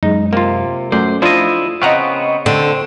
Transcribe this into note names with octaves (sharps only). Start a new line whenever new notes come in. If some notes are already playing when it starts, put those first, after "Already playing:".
F#2 G#3 D#4
C3 A#3 F4
F#2 A3 C5 D5
F3 D4 E4 F4 D#5
C#3 B3 C4 D#5 F5 F#5 A#5 C#6
D3 C4